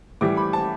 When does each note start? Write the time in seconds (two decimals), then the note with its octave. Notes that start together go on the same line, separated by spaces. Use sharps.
0.21 A2 E3 G3 D6
0.37 B5
0.53 A5